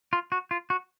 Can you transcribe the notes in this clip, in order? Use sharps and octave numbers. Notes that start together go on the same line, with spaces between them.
F4
F#4
F4
F#4